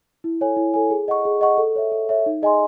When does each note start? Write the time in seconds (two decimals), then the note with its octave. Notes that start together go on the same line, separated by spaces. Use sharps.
0.24 E4
0.41 A4 C#5 G#5
0.57 E4
0.74 A4 C#5 G#5
0.91 G#4
1.08 D#5 F#5 C#6
1.25 G#4
1.41 D#5 F#5 C#6
1.58 A4
1.76 C#5 E5
1.92 A4
2.09 C#5 E5
2.26 D#4
2.42 G#4 D#5 G#5 C6